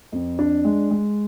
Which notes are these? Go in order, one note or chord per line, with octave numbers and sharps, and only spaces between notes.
F2
D4
G#3
G#3